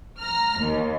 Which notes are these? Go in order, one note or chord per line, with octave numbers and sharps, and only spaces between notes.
A#5 F6
D#2